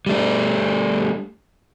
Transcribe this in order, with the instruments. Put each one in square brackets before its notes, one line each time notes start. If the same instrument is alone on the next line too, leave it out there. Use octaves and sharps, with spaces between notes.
[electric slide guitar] G3 A3 D4